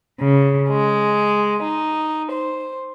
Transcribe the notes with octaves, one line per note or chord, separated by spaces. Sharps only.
C#3
G#3
D#4
C5